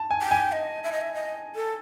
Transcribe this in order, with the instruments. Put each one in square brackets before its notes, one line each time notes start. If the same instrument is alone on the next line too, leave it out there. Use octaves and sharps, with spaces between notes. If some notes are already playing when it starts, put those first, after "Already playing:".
Already playing: [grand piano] A5
G#5
[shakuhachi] G5
[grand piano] G#5
[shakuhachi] D#5
E5
D#5
E5
D#5
A4